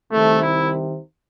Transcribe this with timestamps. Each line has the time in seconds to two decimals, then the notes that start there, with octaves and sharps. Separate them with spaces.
0.10 C2 C3 D#3 A3
0.42 E4